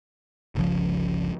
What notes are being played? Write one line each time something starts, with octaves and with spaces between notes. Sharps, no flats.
G1 C#2 C#3 F3